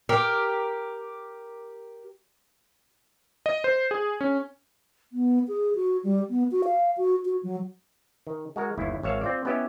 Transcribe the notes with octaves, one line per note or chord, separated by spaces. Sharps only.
G4 A#4
D#5
C5
G#4
C#4
B3
G#4
F#4
G3
B3
F#4
F5
F#4
F#4
F#3
D#3
G#3 F#4 A#4
G1 D#2 E4
G#1 C#5 E5 F5
C4 F4 D5
B3 C#4 E4 G4 D#5 E5